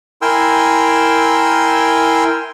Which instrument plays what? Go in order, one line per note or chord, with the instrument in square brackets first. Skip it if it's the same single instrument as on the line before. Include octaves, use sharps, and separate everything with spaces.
[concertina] E4 A#4 G5 G#5 C6 E6